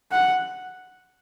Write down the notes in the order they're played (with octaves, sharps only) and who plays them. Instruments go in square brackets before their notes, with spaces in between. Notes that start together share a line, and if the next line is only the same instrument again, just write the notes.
[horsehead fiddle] F#5